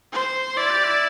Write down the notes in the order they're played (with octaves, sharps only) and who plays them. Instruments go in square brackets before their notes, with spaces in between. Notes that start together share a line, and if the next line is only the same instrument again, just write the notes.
[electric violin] C5
[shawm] E4 [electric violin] D5
[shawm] G4
E4